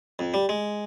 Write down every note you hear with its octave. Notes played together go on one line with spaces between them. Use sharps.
F2
G3
G#3